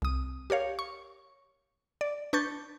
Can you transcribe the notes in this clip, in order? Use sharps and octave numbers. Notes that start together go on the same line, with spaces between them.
C2 D#6
G4 A#4 C#5 F5
C#6
D5
D4 B4 C#6 G6 A6